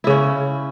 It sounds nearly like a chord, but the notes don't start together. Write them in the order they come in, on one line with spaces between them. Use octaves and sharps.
E4 C#3 C#4